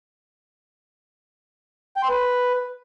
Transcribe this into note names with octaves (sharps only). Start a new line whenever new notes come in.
G5
C6
B4